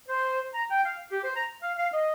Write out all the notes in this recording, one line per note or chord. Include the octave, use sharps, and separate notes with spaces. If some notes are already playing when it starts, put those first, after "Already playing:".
C5
A#5
G5
F5
G4
C5
A#5
F5
F5
D#5